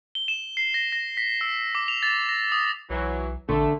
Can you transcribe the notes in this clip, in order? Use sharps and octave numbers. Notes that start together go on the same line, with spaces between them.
G7
E7
C7
A#6
A#6
B6
E6
D6
F7
A6
A#6
D#6
B1 E3 F#3
A1 D3 A3